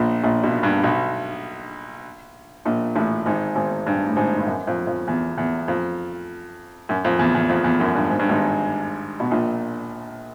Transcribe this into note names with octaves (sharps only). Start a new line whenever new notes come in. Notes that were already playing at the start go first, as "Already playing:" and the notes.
Already playing: A#1 A#2
A#1 A#2
B1 B2
G2
B1 B2
A#1 A#2
A1 A2
G#1 G#2
G#1 G#2
G2
A2
G#1 G#2
G2
F#2
F2
F2
E2
E2
F2
F#2
F2
E2
E2
F2
E2
F#2
G2
G#2
G2
G#1 G#2
B2
A#1 A#2